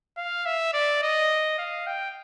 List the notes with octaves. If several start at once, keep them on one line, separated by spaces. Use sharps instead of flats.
F5
E5
D5
D#5
F5
G5